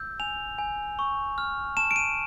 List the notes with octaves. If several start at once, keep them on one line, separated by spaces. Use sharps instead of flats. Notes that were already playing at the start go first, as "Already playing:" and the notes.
Already playing: E6 G6
G#5 F7
G#5
C#6
F6
A5 E7
D7
D#7